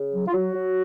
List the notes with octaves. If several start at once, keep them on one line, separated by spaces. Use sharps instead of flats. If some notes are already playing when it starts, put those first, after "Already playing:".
Already playing: C#3
F#3
F4
F#3 F#4
F#3